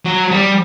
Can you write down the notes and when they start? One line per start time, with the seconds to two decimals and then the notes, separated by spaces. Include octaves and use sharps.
0.05 F#3
0.31 G3